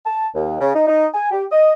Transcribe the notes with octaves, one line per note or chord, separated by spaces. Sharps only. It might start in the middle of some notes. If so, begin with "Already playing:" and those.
A5
D#2
C#3
D#4
D#4
G#5
G4
D#5